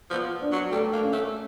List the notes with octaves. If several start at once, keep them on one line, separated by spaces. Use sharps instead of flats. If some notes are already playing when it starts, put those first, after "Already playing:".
F3 B3
D4
F#3
G3 A3
A#3
C#4
A3